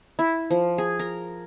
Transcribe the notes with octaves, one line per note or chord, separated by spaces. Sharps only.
E4
F3
G#4
A#4